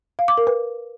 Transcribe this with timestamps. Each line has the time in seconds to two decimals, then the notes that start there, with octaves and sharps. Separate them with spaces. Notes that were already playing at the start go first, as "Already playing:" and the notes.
0.19 F5
0.28 D6
0.38 A#4
0.47 B4